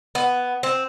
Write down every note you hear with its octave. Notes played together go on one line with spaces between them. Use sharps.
B3
C4